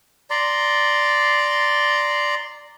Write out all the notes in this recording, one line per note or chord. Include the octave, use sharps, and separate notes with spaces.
D5 A#5 C6